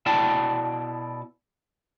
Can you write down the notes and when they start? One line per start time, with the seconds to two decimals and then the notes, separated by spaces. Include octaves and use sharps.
0.06 B2 E4 D5 G5 A5